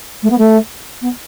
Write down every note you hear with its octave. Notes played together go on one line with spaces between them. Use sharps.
A3
B3
A3
B3